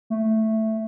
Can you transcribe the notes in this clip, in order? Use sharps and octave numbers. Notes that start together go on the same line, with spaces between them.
A3